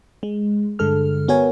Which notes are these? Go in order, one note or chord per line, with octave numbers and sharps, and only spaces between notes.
G#3
G2 D3 G#3 A4 F6
B3 F#4 A#4 C#5 G#5